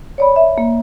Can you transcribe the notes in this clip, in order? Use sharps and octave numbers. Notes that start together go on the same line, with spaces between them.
C#5 D5 B5
E5
A#3